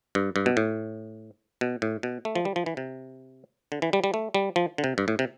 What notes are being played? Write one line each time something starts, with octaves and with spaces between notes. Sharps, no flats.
G2
G2
B2
A2
B2
A2
B2
A3
F3
G3
F3
E3
C3
D3
E3
G3
G3
A3
G3
F3
D3
C3
G2
A2
C3